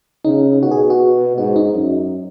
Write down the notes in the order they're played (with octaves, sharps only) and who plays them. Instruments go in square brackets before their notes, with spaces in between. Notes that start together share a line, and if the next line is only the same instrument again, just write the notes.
[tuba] C#3 [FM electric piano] D#4
[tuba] B2 [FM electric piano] F#4
[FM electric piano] G#4
F#4
[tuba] G#2 [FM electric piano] F#4
[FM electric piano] D#4
[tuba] F#2